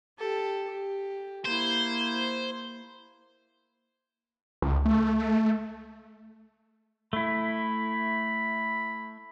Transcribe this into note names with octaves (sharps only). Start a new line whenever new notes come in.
G4 A4
G4
A#3 E4 C5
C#2
A3
A3 E4 B5